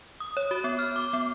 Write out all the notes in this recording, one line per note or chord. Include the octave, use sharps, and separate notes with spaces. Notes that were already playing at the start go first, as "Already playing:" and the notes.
D#6
C#5
F#4
B3
F6
D6
B3